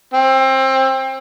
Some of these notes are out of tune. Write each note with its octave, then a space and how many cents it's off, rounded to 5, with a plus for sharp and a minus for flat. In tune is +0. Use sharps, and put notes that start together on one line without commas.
C4 +25